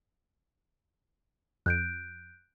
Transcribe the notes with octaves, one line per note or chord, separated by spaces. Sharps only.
F2 F#6 G6 D7